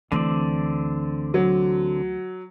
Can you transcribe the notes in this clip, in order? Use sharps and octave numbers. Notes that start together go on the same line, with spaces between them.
D2 D3 E3 C4 D5
F#3